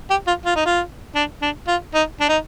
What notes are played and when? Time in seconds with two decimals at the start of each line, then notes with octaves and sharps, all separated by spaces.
0.10 G4
0.27 F4
0.45 F4
0.56 D#4
0.66 F4
1.15 D4
1.42 D4
1.68 F4
1.94 D#4
2.20 D4
2.29 D#4